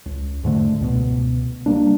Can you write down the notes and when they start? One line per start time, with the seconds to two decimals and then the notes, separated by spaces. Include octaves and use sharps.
0.06 C#2
0.43 E2 G#2 D3 A3
0.80 C#2 B2 B3
1.66 G3 A3 A#3 D4